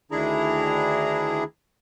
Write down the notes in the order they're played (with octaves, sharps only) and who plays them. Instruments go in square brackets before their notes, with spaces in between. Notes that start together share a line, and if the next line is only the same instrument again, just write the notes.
[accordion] D2 D#3 D4 E4 G#4 A#5